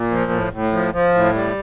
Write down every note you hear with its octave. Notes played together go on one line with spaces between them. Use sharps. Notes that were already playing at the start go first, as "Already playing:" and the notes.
Already playing: A#2
F3
A2
A2
F3
F3
A2
G3